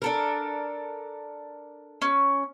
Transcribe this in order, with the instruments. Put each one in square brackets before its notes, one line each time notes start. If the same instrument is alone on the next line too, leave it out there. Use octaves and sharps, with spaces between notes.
[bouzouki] D4 A4 A#4
[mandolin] C#4